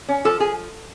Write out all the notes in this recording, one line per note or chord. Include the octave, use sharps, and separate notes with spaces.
C#4
F3 A4
F3 G#4